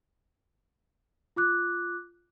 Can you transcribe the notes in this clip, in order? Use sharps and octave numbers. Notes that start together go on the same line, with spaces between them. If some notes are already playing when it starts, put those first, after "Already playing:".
F4 D6 F#6